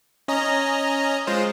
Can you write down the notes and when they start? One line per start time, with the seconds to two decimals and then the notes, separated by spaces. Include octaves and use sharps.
0.28 C#4 D#5 A#5
1.27 G#3 F4 C5